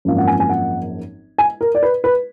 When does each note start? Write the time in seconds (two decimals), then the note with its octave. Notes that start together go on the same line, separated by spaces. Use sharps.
0.05 G#1 F#2 F3 A#3 F5
0.18 F#5
0.27 G#5
0.40 G#5
0.49 F#5
1.38 G#5
1.61 A#4
1.75 D5
1.83 B4
2.04 B4